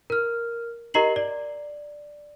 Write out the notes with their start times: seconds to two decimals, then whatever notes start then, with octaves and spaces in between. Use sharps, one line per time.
0.10 A#4 F6
0.94 G4 A#4 D#5 A#5 C7 F#7
1.16 D5